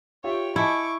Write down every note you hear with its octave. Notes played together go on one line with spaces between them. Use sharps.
F4 G4 C#5 E5 G5
E4 D#5 G#5 A5 C#6 D6